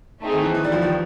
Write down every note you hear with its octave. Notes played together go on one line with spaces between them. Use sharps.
A3 C4 D#4 G#4
D#3
E3
E3
G3
F3
D#3